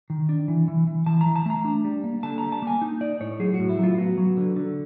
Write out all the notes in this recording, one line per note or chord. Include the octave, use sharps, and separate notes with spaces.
D#3
D4
E3
E3
E3
E3 A5
A#5
E3
A5
A3 A#5
D4
G3
A#3
D3 A5
G3 A#5
A5
A#3 G#5
D#4
D#4 D5
A2 C#5
F#3 G#4
F#4
A2
E4
F#3 F4
B3 F#4
F#3
D3
D3